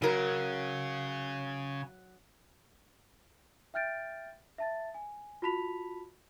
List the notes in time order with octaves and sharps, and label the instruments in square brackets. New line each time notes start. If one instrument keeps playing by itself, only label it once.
[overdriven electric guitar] C#3 [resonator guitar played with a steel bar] F#3 A#4
[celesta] E5 G5 F6 G6 A6 D7
E5 A5 A6
G#5
F4 F#4 A5 B5 B6 F7